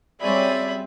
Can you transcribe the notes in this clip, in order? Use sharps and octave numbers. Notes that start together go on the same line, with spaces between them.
C#3 F#3 G3 C4 G#4 D5 E5 B5